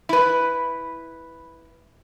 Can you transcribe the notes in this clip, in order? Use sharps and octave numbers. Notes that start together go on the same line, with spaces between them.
E4 B4